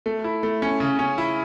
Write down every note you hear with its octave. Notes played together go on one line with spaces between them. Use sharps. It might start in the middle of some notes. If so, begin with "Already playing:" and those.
A3
E4
A3
C#4
C#3
C#4
E4